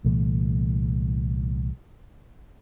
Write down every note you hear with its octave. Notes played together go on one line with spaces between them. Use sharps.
C2 A#2 E3 A3